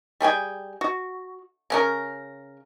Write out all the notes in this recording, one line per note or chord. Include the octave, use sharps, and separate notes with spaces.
G3 G#4 G5 G#5
F#4
C#3 C#4 A#4